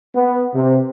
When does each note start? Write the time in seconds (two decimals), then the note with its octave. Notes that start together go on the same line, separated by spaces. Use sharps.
0.15 B3
0.55 C3